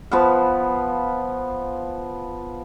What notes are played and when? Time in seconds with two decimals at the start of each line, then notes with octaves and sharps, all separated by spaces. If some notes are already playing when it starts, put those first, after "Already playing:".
0.11 F3 B3 B4 F5